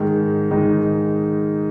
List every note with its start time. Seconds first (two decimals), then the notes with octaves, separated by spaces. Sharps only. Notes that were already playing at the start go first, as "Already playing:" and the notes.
Already playing: G#2 D#3 G#3 D#4
0.51 G#2 D#3 G#3 D#4